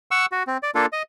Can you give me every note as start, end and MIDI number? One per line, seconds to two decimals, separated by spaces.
0.11 0.26 78
0.11 0.26 85
0.11 0.26 88
0.32 0.43 66
0.47 0.57 60
0.63 0.71 74
0.75 0.86 58
0.75 0.86 62
0.75 0.86 65
0.75 0.86 69
0.93 1.02 75